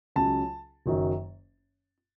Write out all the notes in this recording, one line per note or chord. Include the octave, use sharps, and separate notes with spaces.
C#2 C#3 F#3 A5
F#1 F#2 D#3 F#3